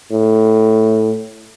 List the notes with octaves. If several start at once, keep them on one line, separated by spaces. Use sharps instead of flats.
A2